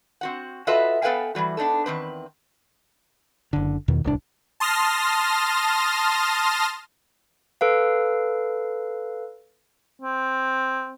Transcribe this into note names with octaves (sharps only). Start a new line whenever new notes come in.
C4 F#4 F#5
F4 F#4 A4 B4 D#5 E5
B3 A4 B4 F5 G5 G#5
E3 F3 G3 F#4
B3 D4 D#4 A4
E2 D#3 C4 B4
F#1 D3
E2 B2 D#3
D1 C2 D4
A5 C6 D#6 F6 A#6
A4 B4 F5
C4